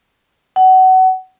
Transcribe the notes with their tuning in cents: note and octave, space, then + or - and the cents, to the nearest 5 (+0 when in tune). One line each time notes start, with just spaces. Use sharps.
F#5 +25